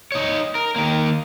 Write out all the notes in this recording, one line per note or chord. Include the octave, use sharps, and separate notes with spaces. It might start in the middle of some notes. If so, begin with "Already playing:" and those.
D#4 C#5
A#4
D#3 A#3